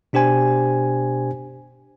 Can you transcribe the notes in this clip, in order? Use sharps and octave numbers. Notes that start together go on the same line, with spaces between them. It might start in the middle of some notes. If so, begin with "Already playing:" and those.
B2 D4 G4 C5 G#5